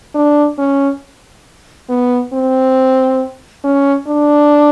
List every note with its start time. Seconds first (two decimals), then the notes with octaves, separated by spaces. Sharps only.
0.15 D4
0.58 C#4
1.89 B3
2.33 C4
3.64 C#4
4.08 D4